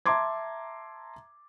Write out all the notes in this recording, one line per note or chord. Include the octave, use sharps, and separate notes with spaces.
E5 A5 A#5 C6 D6 G#6